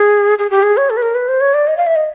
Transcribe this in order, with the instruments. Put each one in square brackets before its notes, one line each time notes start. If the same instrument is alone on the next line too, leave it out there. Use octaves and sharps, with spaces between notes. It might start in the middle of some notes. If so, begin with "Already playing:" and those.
Already playing: [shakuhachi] G#4
G#4
G4
G#4
C#5
A4
B4
A#4
B4
C5
C#5
D5
D#5
F5
E5
D#5